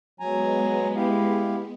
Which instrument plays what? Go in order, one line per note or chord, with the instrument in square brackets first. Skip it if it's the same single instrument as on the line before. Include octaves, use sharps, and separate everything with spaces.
[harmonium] F#3 G#5 A#5 [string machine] G#3 B3
[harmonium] E4 G4 F5